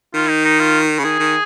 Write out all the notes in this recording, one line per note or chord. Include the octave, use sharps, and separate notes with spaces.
D#3 F4
D#4
D#4
F4
C#3
D#3 G#4
D#3